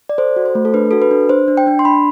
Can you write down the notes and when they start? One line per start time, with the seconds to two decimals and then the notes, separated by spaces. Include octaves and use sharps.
0.09 D5
0.18 A4 C5
0.36 F#4
0.46 C5
0.55 A3
0.65 A4
0.74 D4 B4
0.91 F#4 A4
1.02 B4
1.11 D4
1.29 D4 C5
1.48 D4
1.57 G5
1.67 D4
1.79 C6
1.85 D4 B5